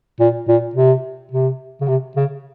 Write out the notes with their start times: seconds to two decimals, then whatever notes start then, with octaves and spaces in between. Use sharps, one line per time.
0.20 A#2
0.48 A#2
0.75 C3
1.32 C3
1.81 C#3
1.88 C3
2.16 C#3